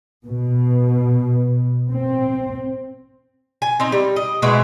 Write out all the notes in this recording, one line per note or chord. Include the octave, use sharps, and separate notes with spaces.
B2
C4
G#5
C4 D#4
G3
D#5
B2 G#3 C4 E4